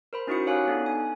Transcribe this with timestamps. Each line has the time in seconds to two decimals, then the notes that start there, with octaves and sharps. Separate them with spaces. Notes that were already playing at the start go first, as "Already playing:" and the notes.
0.13 A#4 C5 B5
0.27 C#4 D#4 E4 F#4 D#6 C#7
0.47 G4 C#5 F5 G#5 F#6
0.67 B3 D4 D#4 A4
0.86 G#5